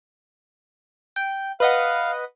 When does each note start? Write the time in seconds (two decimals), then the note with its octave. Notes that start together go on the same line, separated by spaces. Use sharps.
1.16 G5
1.60 B4 D#5 F5 F#5